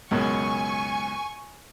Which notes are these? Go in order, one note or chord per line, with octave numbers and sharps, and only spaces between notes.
C#2 F#2 B2 G#5 C#6